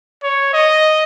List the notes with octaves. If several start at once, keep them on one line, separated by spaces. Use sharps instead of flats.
C#5
D#5